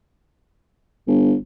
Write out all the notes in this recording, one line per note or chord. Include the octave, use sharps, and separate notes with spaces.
G1